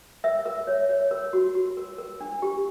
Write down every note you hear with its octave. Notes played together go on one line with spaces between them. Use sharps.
A#4 E5
A#4
C#5
C#5
A#4
F#4
F#4
A#4
A#4
D4
G4